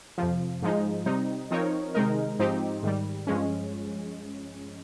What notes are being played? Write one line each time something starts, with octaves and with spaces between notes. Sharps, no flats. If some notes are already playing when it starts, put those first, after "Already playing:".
F2 C3 F3
G#2 F3 G#3 D#4
C3 G3 C4 D#4
F3 C4 D#4 A#4 C#5
C3 D#3 G#3 D#4 A#4
G#2 F3 C4 D#4 G4
G#2 D#3 G3
G2 F3 G#3 C#4